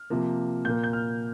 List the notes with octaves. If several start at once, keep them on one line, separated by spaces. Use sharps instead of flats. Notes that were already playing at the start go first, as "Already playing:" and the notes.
Already playing: F6
C3 F3 A#3
A#2 A#3 G6
G6
F6